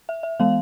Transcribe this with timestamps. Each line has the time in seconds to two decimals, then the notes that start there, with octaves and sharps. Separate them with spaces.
0.09 E5
0.23 E5
0.40 E3 G#3 B3 F5